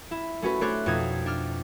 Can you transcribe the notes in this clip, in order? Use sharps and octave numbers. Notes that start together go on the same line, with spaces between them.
E4
A3 C#4 F#4 B4
A3 D4 C5 C#5 F#6
F2 B2 D#4 G#6
D4 F6